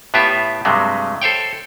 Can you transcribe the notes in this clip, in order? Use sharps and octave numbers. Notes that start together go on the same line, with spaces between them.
A2 B3 F4 G4 E5
G2 C3 F#3 G#3 A3
A4 C5 C#5 G5